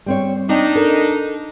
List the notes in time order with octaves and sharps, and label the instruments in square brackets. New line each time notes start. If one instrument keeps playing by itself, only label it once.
[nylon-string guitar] G3 C4 C#5
[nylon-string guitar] C4 [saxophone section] D4 D#4
[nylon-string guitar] A4 A#4